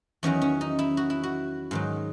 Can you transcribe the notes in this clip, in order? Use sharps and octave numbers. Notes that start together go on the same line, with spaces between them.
E2 D#3 F#3 C#4
C#4
D#4
E4
F#4
E4
F#4
G#2 D#3 F#3